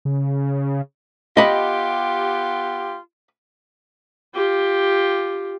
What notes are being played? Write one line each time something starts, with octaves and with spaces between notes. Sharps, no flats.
C#3
B3 F4 G4 D#5 B5
F4 G4